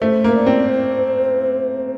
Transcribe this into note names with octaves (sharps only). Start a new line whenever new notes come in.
A3 C5
A#3
D5
C4
C5